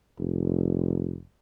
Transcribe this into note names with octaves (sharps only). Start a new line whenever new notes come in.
F1